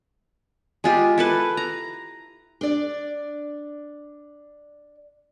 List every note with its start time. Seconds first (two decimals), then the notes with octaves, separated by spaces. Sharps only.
0.84 G#3 F4 G4
1.18 E4 A4 B4
1.57 A#5
2.61 D4 D5